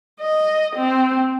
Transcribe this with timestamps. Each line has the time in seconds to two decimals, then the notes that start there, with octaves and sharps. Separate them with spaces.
0.20 D#5
0.76 C4